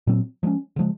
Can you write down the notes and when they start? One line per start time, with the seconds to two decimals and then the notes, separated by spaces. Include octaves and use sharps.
0.07 A#2 F#3 C4
0.43 F3 G#3 C#4
0.76 C#3 F3 G#3